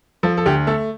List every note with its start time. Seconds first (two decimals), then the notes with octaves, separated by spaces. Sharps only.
0.23 F3 A4
0.37 A4
0.46 D2 G4
0.67 A3 A4